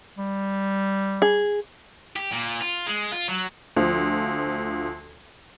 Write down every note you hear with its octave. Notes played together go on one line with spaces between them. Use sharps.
G3
G#4
G4
A#2
F4
G#3
F4
F#3
D2 F3